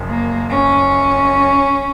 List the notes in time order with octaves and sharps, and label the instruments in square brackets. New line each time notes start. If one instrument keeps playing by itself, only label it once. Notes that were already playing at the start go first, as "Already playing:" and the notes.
Already playing: [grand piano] F#1 F#2 F3
[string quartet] A#3
C#4